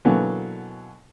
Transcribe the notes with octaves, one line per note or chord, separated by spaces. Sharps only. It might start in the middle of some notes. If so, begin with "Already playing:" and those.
B2 D3 E3 F#3 A#3